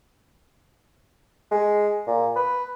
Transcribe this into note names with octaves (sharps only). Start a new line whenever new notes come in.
G#3
A#2
B4